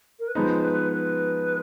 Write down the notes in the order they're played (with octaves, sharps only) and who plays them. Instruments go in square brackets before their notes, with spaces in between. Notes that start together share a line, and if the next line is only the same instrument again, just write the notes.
[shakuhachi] A#4
B4
[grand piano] F3 G#3 B3 D#4 [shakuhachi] C5
[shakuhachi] B4
B4